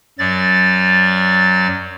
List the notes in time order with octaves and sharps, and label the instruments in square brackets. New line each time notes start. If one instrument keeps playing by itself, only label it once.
[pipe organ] F#2 F#3 D5 A6